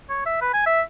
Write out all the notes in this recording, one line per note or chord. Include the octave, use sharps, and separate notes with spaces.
C#5
E5
B4
G#5
E5